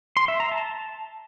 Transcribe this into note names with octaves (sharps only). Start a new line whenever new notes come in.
C6
E5
A#5
A5